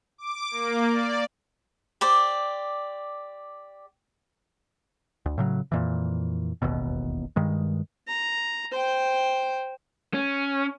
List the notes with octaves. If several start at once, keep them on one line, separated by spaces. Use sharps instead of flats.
D6
A#3
D5
G4 C5 D5
D2
A2 C#3 F#3
F2 A#2 E3
E1 A1 D#2 B2
G2 D#3 G#3
A#5
C5 G5
C#4